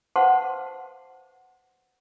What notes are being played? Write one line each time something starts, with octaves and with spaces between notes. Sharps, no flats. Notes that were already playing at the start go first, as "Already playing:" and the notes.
B4 C5 F5 F#5 A5 C6